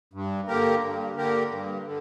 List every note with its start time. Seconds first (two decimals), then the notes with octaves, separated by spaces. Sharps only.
0.13 G2
0.48 D3 A#3 G4 A#4
0.82 G2
1.16 D3 A#3 G4 A#4
1.50 G2
1.85 D3